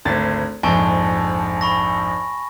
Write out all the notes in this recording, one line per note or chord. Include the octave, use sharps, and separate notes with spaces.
G#1 D2 A6
A#1 F2 G#2 G#5 A5 C#6
B5 C#6 A#6